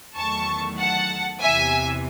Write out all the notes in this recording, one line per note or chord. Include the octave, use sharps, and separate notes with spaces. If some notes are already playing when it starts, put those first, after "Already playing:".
E2 D#3 F#3 A3 A5 C#6
F#5 A5
E2 C3 E3 E5 G#5